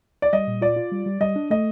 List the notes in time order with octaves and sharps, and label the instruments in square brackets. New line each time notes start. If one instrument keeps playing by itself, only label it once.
[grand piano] D5
[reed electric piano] G3 [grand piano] D#5
[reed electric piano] A#2
[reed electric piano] F4 [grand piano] D5
[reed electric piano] F4
G3
G3
[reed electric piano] G3 [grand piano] D#5
[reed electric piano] D4
[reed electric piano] A3 [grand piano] D#5